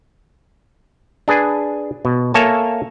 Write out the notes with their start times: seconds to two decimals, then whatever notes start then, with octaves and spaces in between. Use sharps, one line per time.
1.28 D4 G#4 B4 G#5
2.05 B2
2.34 A#3 A4 C#5 E5 G#5 A5